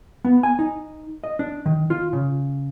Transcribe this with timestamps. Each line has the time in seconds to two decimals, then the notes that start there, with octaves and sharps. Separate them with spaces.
0.25 B3
0.43 G#5
0.59 D#4
1.24 D#5
1.39 D4
1.66 D#3
1.90 F4
2.13 C#3